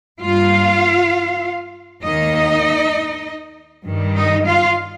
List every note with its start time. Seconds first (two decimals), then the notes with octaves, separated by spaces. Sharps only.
0.21 G2 G3 A#3 F4 F5
2.03 D#2 D#3 A#3 D#4 D#5
3.85 G2 D#3 G3
4.16 D#4 D#5
4.46 F4 F5